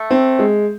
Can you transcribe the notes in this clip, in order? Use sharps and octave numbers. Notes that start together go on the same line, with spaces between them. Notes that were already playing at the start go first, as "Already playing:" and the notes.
Already playing: A3
C4
G#3